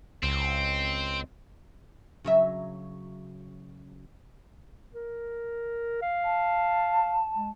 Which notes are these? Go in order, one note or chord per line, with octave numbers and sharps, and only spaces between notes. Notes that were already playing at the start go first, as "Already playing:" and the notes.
C#2 C4
C#3 F#3 E5
A#4
F5
A5
G#3